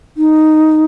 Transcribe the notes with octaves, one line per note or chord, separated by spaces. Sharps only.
D#4